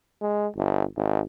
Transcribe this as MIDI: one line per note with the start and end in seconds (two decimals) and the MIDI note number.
0.21 0.47 56
0.56 0.84 31
0.96 1.21 32